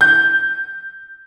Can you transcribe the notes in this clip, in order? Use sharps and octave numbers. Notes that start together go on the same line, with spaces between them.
G6